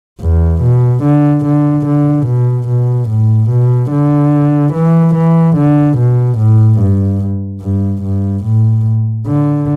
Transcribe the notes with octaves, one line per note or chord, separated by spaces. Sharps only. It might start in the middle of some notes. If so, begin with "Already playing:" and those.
E2
B2
D3
D3
D3
B2
B2
A2
B2
D3
E3
E3
D3
B2
A2
G2
G2
G2
A2
D3